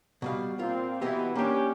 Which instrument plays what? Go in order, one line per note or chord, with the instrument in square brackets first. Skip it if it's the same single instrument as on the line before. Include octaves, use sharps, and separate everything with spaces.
[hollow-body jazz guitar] B2 G3 F5
[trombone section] A#2 A#3 C4 [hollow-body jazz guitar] F4
[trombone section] B2 E3 [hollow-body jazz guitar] B3 G4 D#5
[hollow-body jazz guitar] A#3 D4 [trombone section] C#4 G4